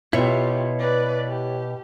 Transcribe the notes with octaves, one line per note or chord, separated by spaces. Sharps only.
B2 E4 F4 G4 C#5 E5
B4 D5
G4